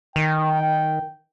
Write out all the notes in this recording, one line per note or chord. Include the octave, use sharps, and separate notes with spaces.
D#3 G5